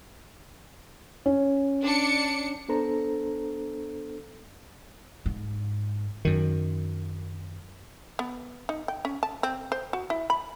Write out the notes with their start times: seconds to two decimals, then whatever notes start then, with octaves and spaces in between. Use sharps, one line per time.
1.26 C#4
1.85 D4 C#7
2.69 B3 D4 A4 C5 A#5
5.26 G#2
6.25 F#2 D#3
8.19 B3
8.69 D#4
8.88 G5
9.05 C#4
9.23 A5
9.43 C4
9.72 C5
9.93 F#4
10.10 E4
10.30 B5